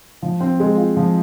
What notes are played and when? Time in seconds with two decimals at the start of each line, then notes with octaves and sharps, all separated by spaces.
0.22 F3
0.40 C4
0.60 G#3
0.77 F4
0.96 F3